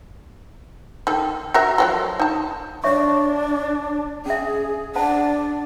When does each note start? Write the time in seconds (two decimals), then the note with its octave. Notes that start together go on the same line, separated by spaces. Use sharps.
1.07 D#3 A4
1.54 F#4 A#4 E5
1.78 F3 F#3 A4
2.20 D#4 A5
2.84 D4 C#5 E5 C#6
4.26 C#4 G#4 E5
4.95 D4 C5 F#5 A5